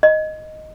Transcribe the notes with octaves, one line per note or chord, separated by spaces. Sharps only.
D#5